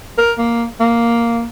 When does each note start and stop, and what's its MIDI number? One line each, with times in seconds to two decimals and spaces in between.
0.18 0.33 70
0.38 0.65 58
0.80 1.46 58